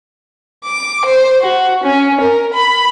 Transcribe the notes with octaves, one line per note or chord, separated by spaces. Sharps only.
D6
C5
F#4
C#4
A#4
B5